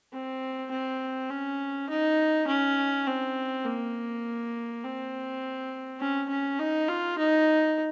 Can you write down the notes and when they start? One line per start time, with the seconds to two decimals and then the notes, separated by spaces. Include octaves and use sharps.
0.13 C4
0.71 C4
1.30 C#4
1.89 D#4
2.48 C#4
3.06 C4
3.65 A#3
4.84 C4
6.00 C#4
6.30 C#4
6.59 D#4
6.89 F4
7.18 D#4